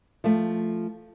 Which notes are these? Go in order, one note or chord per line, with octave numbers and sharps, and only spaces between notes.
F3 A3